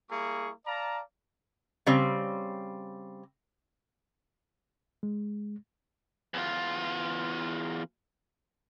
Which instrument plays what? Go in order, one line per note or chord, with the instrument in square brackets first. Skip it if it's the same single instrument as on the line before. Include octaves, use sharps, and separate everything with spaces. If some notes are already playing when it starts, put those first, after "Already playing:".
[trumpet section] G3 A#3 E4 G#4 C#6
D5 F5 A5 A#5
[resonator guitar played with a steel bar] C#3 G3 C4
[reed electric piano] G#3
[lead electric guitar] E2 F4